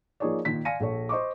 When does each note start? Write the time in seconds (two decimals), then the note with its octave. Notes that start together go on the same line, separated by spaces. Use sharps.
0.20 F3 A#3 D#4 G#4 C#5 D5
0.45 A#2 D#3 B6
0.65 D5 F5 G#5 A#6 C#7 D#7
0.80 A#1 A4 C#5
1.09 C5 D#5 C#6 D6